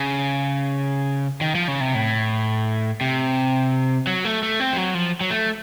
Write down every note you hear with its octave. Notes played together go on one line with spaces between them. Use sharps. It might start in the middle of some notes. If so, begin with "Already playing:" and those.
Already playing: C#3
D#3
F3
C#3
C3
A2
C3
F#3
A3
A3
C4
F3
F#3
F3
F#3
A3